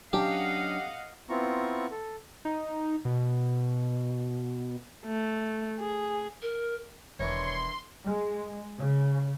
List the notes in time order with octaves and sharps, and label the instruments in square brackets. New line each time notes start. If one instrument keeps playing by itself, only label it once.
[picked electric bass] F#3 C#4 D4 [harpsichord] G4 [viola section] D#5 F5 F#5
[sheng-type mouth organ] B3 C4 E4 F4 A#5 C#6
A4
[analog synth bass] D#4
B2
[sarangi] A3
G#4
[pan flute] A#4
[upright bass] E1 [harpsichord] D#3 E3 D4 [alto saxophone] C#5 [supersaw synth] C6
[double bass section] G#3
C#3